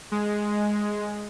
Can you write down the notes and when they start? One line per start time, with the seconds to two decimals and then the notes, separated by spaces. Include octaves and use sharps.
0.12 G#3